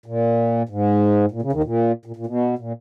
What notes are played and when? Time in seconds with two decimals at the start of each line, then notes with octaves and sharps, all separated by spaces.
0.06 A#2
0.69 G#2
1.31 A#2
1.42 C#3
1.53 D#2 D#3
1.64 A#2
2.05 A#2
2.16 A#2
2.27 B2
2.58 A#2